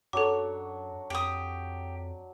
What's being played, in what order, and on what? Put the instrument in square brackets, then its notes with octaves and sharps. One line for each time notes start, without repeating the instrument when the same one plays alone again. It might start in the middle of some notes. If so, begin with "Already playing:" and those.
[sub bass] F#2 [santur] F#3 D4 C#6 [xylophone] A4 D6
[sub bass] F2 [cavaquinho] G4 D#6